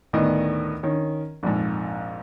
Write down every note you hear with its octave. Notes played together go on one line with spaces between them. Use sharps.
D2 A2 D#3 B3 D#5
D#3 C#4
A#1 F2 G#2